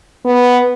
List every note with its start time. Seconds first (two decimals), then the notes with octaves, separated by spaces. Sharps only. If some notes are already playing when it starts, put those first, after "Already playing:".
0.25 B3